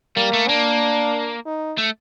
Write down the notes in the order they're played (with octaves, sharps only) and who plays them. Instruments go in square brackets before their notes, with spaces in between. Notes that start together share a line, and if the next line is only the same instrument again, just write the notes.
[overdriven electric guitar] G3 [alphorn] A#3
[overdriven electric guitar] A3
[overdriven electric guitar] A#3 [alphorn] D4
[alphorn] D#4
[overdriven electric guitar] A3